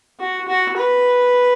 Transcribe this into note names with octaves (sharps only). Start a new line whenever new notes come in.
F#4
F#4
B4